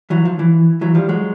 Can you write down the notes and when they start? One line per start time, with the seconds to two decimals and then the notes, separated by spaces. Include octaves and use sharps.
0.10 E3 F#3
0.25 F3
0.39 E3
0.81 E3 F#3
0.95 F3 G3
1.09 F#3 G#3